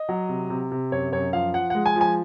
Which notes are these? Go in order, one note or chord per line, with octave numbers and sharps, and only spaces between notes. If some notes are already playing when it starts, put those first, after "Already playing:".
Already playing: D#5
F#3
C3
C3
C3
F#2 C#5
F#2 C#5
F3 F5
F3 F#5
G#3 F#5
G#5
F3
G#5